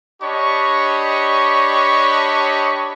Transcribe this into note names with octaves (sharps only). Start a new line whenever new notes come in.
D4 G4 C#5 D#5 B5 C#6